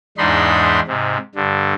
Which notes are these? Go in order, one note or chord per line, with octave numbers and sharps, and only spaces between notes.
E2 G#2 D4 D#4 B5 C6
G#2 C3
G2 D3